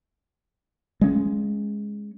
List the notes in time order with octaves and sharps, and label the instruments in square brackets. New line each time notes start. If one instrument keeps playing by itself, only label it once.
[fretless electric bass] G#3 C#4